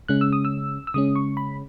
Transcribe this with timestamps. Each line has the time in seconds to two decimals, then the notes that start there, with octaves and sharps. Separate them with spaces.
0.08 C#3 G#3 C#4 F#6
0.21 E6
0.33 D#6
0.45 E6
0.87 E6
0.94 C#3 G#3 C#4 D#6
1.16 C#6
1.37 B5